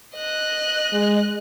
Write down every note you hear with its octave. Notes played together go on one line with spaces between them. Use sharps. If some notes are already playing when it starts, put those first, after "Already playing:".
D#5 F#6
G#3